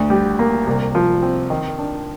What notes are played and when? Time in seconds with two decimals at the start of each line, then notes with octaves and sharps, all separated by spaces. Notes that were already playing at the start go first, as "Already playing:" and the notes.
Already playing: D2
0.10 G3
0.39 A#3
0.67 C2
0.95 F3
1.23 C4
1.50 D#3
1.78 D4